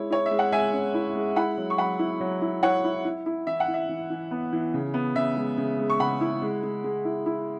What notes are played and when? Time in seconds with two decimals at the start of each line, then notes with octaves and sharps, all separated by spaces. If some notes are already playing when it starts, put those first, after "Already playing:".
Already playing: G#3 E4 C#5
0.10 E4 C#5
0.26 E5
0.31 G#3
0.39 F#5
0.52 G#3 E5 G#5
0.73 C#4
0.94 E4
1.15 G#3
1.36 E4 F#5 B5
1.58 F#3
1.70 C#6
1.78 F#3 F#5 B5
1.99 E4
2.20 F#3
2.42 E4
2.62 E4 C#5 F#5
2.84 E4
3.05 E4
3.26 E4
3.47 E3 E5
3.60 F#5
3.68 E3
3.74 E5
3.89 E3
4.10 E3
4.31 B3
4.53 E3
4.74 C#3
4.94 B3
5.15 C#3 E5
5.36 G#3
5.58 C#3
5.79 G#3
5.90 C#6
5.99 C#3 F#5 B5
6.21 E4
6.42 G#3
6.63 G#3
6.84 G#3
7.05 E4
7.26 E4